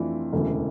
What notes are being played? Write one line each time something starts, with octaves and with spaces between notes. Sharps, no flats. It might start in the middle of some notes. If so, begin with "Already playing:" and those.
Already playing: F2 E3 A3 D4 F4
E1 D2 C#3 E3